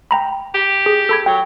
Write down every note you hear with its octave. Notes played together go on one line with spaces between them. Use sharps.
G5 A#5 B5
G4
G#4
A4 B5 G#6
F#3 G5